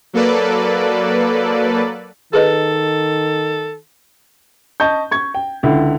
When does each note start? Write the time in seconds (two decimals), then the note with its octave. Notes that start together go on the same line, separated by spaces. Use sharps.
0.13 F#3 A#3 A4 B4 D5
2.33 D#3 G#4 A4 B4 D#5
4.80 D#5 A5 C#6 G6
5.11 C#6 G#6
5.35 G5
5.63 C#2 D3 E4